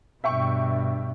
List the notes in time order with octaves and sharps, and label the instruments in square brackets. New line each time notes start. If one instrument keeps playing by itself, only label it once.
[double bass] G2 B2 [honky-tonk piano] E5 G5 C#6